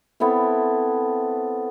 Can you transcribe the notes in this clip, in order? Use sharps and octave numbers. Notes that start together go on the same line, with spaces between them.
B3 C4 E4 A4